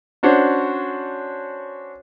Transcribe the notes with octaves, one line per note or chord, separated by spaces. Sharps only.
C#4 D4 F#4 C5 C#5